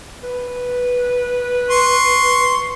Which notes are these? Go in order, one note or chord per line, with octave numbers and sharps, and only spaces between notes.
B4
C6 C#6